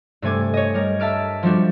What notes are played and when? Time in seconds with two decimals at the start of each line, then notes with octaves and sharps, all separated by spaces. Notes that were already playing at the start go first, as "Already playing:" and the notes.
0.22 G2 C3 A3 G#5 D6
0.54 C#5 D#5
0.74 G3 A#4
1.00 E5 A5 F6 D7
1.43 F3 G3 D4 F#4